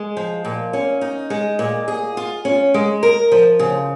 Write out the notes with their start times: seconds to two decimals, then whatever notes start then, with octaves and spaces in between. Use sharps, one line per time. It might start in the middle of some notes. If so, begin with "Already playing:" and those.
Already playing: G#3
0.17 F3
0.45 A#2
0.73 C#4
1.01 D#4
1.30 G#3
1.59 A#2
1.88 G#4
2.17 F4
2.45 C#4
2.74 G#3
3.03 A#4
3.32 F3
3.59 C#3